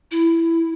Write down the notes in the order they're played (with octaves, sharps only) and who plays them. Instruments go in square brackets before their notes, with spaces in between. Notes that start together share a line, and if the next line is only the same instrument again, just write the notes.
[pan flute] E4